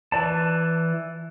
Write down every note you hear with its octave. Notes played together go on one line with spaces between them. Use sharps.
E3 D5 A5